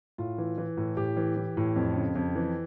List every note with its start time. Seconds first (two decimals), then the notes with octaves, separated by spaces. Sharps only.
0.18 A2 F4
0.38 E3
0.58 E3
0.77 A2
0.97 A2 G4
1.17 E3
1.37 E3
1.57 A2
1.76 F2
1.96 C#3
2.15 F2
2.35 E3